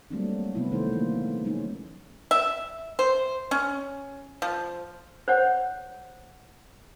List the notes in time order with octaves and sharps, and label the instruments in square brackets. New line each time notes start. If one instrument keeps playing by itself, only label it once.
[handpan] F#3 G3 A3 A#3 C4 D4
C3 F3 B3 E4
D#3 F3 A3 D#4 C5
E3 A#3
F#3 G#3 A#3 C#4 D#4
[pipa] E5
C5
C#4
F3
[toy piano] C5 C#5 F#5